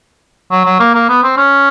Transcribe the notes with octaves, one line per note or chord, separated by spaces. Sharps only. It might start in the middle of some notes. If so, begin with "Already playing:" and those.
F#3
F#3
A#3
A#3
B3
C4
C#4